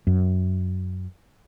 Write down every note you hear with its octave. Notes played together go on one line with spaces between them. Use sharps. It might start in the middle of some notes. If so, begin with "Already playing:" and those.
F#2